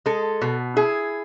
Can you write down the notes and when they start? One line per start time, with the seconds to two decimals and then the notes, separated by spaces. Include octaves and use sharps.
0.06 G#3 A4
0.42 B2
0.76 E4 G#4